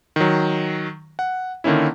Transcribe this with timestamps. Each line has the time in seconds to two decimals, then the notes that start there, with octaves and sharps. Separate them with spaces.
0.16 D#3 F#3
1.19 F#5
1.64 D3 D#3 A#3 C#4 E4